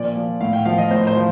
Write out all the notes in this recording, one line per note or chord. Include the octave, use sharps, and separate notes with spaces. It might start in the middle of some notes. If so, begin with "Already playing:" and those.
Already playing: A#2 F3 D5
F3
A2 F5
G5
F3 F5
D#5
A2 C5
C5
F3